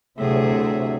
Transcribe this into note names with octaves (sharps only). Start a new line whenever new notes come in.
D2 A2 C3 F#3 G#4 E5